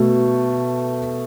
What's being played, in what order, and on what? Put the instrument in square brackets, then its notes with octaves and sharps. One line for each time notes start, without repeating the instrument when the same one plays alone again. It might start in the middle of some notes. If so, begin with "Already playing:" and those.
Already playing: [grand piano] B2 A3